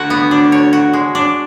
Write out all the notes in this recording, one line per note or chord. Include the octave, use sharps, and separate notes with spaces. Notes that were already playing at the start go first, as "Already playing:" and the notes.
Already playing: D2 D3 F#4
B3
D4
C#5
F#4
G#3
D4